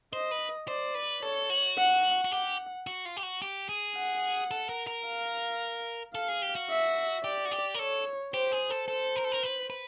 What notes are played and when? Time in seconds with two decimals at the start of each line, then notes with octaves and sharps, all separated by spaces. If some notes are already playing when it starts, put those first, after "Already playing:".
0.13 C5 D#5
0.31 B4
0.68 C5 D5
0.95 B4
1.22 A4 C#5
1.50 F#4
1.77 F#5
2.25 F#4
2.32 G4 F#5
2.87 F#4
3.05 F4
3.17 G4
3.23 F#4
3.42 G4
3.69 G#4
3.96 F#5
4.51 A4
4.69 A#4
4.87 A#4
5.06 F5
6.15 A4 F5
6.28 G#4
6.42 G4
6.55 F#4
6.70 E5
7.24 G4 D5
7.45 F#4
7.51 G4
7.74 A#4
7.79 A4 C#5
8.34 G4 C5
8.52 G#4
8.70 A4
8.88 A4 C5
9.16 A#4
9.24 A4
9.32 A#4
9.43 B4
9.70 B4